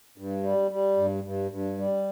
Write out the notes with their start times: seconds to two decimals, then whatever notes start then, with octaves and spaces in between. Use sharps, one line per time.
0.18 G2
0.43 G3
0.71 G3
0.97 G2
1.24 G2
1.51 G2
1.78 G3